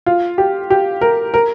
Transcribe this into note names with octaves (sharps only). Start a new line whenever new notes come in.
F4
G4
G4
A#4
A#4